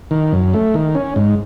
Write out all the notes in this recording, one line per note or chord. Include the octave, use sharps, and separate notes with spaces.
D#3
F#2
A3
D#3
C#4
G#2